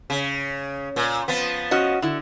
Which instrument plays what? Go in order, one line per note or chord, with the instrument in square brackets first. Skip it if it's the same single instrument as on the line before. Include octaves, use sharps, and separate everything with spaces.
[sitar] C#3
A#2
F3 B3
[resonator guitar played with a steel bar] C#4 F#4 D#5
D3 E4